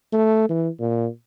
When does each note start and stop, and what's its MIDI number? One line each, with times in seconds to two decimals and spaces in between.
0.13 0.48 57
0.50 0.68 52
0.80 1.07 46